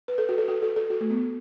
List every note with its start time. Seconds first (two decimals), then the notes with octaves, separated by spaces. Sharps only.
0.08 B4
0.18 A4
0.29 F#4
0.38 A4
0.48 F#4
0.62 A4
0.76 A4
0.90 F#4
1.01 A3
1.10 B3